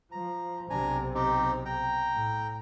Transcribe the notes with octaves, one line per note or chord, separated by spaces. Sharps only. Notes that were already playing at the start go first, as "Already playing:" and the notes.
F3 A#5
B1 C3 D4 G#5 A#5
C4 D#4 G4
G5 A#5
A2